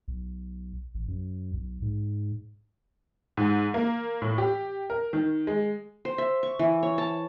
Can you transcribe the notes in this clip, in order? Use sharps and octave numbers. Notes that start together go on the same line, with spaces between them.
B1
A1
F#2
B1
G#2
G#2
A#3
A2
G4
A#4
D#3
G#3
C5
E5
C#6
E3
C#5
A5